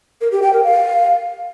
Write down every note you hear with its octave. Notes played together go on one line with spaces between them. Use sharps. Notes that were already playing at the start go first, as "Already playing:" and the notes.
A#4
G4
G5
A#4
F5